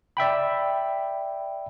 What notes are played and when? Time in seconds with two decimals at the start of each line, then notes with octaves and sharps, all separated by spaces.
0.17 D5 E5 G5 B5